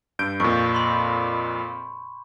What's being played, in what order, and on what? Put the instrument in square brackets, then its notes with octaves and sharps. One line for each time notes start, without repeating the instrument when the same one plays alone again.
[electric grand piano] G2 G6 D7
[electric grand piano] F2 A#2 [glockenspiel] C#6
[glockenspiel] B5 C6